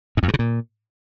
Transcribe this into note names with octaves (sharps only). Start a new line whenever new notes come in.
G#2
F2
G2
C#3
A#2